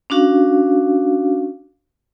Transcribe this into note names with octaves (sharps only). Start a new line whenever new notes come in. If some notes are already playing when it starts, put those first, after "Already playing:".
C#4 D4 F#4 F5